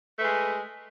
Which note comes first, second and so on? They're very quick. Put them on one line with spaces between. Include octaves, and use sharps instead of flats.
A3 B4 G#3